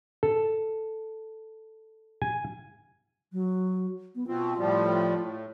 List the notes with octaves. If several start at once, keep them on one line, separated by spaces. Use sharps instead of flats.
A4
G#5
F#3
B3
B2 C4 F4
A2 F3 G3
A2